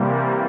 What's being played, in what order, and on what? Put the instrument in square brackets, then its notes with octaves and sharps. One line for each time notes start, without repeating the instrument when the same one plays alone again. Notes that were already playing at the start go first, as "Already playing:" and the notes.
Already playing: [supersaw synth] C3 E3 G3 A#3